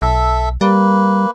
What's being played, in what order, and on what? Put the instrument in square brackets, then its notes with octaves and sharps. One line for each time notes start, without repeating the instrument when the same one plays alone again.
[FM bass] B1 [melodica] A4 E5
[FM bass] G3 [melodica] A#3 B4